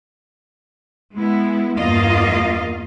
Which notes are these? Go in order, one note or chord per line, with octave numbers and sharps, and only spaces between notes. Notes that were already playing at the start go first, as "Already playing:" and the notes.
G#3 B3 E4
E2 G2 A#3 F4 D#5 F5